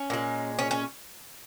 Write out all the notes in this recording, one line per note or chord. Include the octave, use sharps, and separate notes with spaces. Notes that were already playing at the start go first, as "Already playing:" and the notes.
Already playing: C#4
A#2 G#3
C#4
C#4